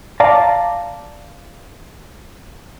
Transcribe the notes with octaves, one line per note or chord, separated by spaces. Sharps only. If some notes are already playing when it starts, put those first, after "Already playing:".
D5 F5 A5 A#5